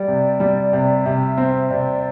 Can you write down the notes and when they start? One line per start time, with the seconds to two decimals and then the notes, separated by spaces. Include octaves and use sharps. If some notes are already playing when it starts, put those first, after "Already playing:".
Already playing: G3 D5
0.08 C3
0.40 G3
0.73 C3
1.06 C3 E5
1.38 C4
1.71 C3 D5